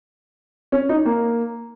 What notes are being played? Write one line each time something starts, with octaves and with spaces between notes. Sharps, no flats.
C#4
D#4
A#3